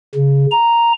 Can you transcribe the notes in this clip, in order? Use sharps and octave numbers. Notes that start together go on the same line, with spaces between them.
C#3
A#5